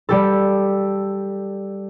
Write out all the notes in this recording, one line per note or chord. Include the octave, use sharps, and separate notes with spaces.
G3 G4 A4